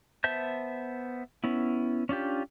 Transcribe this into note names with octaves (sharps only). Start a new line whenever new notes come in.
B3 C5 E5 A5 G6
B3 C#4 E4
C#4 D4 F4 G4